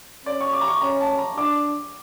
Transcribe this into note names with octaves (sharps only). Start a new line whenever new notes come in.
C#4 D5
C#6
D6
A#5
C#6
C#4 A#5
A5
A#5
D4 D6